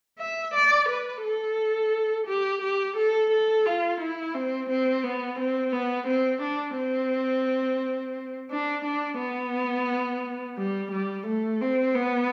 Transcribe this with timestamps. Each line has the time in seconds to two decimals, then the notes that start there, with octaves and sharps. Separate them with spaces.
0.20 E5
0.55 D5
0.89 B4
1.24 A4
2.27 G4
2.62 G4
2.97 A4
3.31 A4
3.66 F4
4.01 E4
4.35 C4
4.70 C4
5.04 B3
5.39 C4
5.73 B3
6.07 C4
6.42 D4
6.77 C4
8.51 D4
8.85 D4
9.20 B3
10.58 G3
10.92 G3
11.27 A3
11.61 C4
11.96 B3